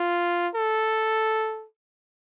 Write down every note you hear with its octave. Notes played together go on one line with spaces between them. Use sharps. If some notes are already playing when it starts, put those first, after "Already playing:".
Already playing: F4
A4